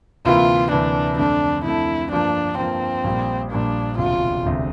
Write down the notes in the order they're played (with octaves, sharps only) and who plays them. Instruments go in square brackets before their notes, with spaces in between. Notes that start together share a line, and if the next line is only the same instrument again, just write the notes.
[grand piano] D2 C3 E3 A#3 E4 [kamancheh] F4
[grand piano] D2 C3 E3 A#3 E4 [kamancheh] D4
[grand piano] F2 D3 A3 [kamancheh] D4
[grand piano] F2 D3 A3 [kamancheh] E4
[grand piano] G2 F3 A#3 F4 [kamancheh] D4
[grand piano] G2 F3 A#3 F4 [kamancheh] C4
[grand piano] A#1 A#2 G3 A#3
[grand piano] A#1 A#2 G3 A#3 [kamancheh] D4
[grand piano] E1 D2 C3 [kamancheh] F4
[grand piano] E1 D2 C3